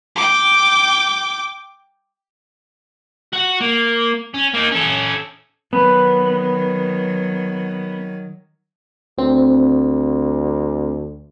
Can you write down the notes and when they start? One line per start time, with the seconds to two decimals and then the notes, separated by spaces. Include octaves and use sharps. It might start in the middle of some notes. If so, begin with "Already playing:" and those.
0.16 G5 D6
3.33 F#4 F#5
3.61 A#3
4.34 C#4
4.54 A#3 D#4
4.71 C#4 A4
5.73 D#3 F#3 B3
9.18 D2 C4